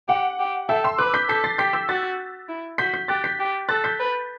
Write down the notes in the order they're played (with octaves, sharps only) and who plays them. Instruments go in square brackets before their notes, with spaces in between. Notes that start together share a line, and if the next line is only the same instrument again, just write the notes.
[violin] G4 [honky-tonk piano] F#5
[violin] G4
[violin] A4 [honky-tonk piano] E5 G5
[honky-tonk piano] C6 E6
[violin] B4 [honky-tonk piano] D6 F#6
[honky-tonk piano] G6 B6
[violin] A4 [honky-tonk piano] G6 B6
[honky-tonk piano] A6 C7
[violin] G4 [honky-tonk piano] G6 B6
[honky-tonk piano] E6 G6
[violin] F#4 [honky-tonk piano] F#6 A6
[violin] E4
[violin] F#4 [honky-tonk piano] G6 B6
[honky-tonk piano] G6 B6
[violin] G4 [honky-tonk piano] F#6 A6
[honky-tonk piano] G6 B6
[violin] G4
[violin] A4 [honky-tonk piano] F#6 A6
[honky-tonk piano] G6 B6
[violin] B4